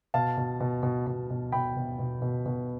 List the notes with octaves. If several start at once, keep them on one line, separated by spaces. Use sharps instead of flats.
B2 F5 A5
B2
B2
B2
B2
B2
B2 G5 B5
B2
B2
B2
B2